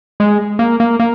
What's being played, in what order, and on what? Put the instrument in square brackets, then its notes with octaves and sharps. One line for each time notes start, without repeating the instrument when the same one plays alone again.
[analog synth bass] G#3
A#3
A#3
A#3